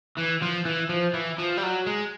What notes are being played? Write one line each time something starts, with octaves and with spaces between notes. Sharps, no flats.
E3
F3
E3
F3
E3
F3
G3
F#3
G#3